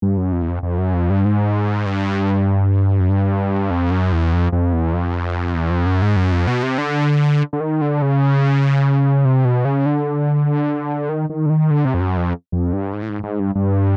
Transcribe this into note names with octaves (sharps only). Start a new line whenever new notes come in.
G2
F#2
F2
E2
F2
F2
F#2
F2
G2
G#2
G2
F#2
G2
F2
F#2
E2
F2
F2
E2
F2
E2
F2
F#2
G#2
F#2
F2
B2
C3
D3
D3
D#3
D3
C#3
C3
B2
C#3
D3
D#3
D#3
D3
D#3
D3
C3
F2
F#2
F2
F2
G2
G#2
A2
G#2
G#2
G2
G2